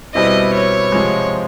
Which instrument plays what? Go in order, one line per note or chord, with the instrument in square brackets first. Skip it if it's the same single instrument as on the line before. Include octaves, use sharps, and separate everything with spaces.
[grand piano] B2 G3 C4 E4 [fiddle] D#5
[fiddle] C#5
[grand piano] C3 F3 G#3